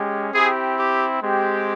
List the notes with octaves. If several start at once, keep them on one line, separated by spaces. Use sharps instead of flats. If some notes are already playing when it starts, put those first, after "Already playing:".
Already playing: G#3 C#4 G4
C4 E4 G4 G#4
G4
G#3 C4 G4